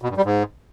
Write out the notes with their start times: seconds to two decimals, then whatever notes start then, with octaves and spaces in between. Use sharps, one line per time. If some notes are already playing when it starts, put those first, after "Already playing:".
0.02 B2
0.09 G2
0.17 G3
0.25 G#2